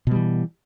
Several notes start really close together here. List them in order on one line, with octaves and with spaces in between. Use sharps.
B2 G3 E3